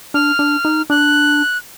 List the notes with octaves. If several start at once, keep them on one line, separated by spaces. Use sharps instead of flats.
D4 F6
D4
D#4
D4 F#6